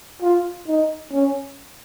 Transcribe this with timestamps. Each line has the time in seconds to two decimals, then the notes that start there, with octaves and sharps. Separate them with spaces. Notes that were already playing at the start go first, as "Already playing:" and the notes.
0.22 F4
0.68 D#4
1.12 C#4